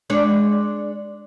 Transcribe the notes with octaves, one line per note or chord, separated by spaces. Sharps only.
G#3 D4 C#5